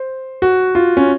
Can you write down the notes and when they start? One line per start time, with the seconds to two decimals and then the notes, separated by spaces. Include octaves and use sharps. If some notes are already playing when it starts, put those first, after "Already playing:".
Already playing: C5
0.42 F#4
0.75 F4
0.97 C#4